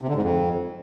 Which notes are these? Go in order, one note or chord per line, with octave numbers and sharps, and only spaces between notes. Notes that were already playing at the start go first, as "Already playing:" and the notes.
C3
D3
G#2
F2